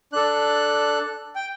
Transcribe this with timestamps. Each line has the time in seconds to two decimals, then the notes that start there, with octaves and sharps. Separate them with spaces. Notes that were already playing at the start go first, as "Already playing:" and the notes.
0.13 D4 A4 F#6
1.35 G5